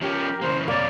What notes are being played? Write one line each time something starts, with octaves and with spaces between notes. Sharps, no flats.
F3 C#4 G4 A#4
C#3 E3 A#3 C5
F#2 C3 A#3 C#5 D5